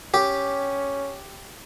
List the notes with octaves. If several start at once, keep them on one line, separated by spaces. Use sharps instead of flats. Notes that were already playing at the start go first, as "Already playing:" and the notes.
C#4 G4